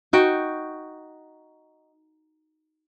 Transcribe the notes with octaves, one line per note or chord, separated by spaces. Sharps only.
D#4 F#4 G5